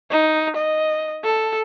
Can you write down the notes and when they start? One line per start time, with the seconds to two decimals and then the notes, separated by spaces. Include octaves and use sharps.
0.11 D#4
0.56 D#5
1.24 A4